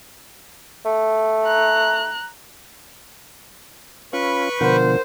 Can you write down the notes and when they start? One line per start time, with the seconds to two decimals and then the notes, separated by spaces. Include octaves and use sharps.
0.85 A3
1.46 A#5 F#6
4.13 C#4 F4 B4 B5 C#6
4.61 B2 D3 F3 A#4 C5 F#5